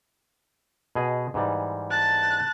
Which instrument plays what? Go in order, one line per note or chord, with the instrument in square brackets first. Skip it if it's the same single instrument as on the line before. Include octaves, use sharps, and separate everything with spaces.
[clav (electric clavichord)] B2 G#4 D#5
G#2 E3 G3
[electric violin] A5 F#6